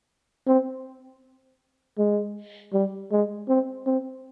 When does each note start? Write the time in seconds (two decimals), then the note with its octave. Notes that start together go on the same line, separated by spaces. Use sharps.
0.47 C4
1.98 G#3
2.73 G3
3.12 G#3
3.48 C4
3.86 C4